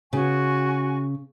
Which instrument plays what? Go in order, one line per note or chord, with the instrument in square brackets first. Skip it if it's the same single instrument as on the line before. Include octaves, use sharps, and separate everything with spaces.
[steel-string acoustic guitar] C#3 [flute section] F#4 G#5 C#6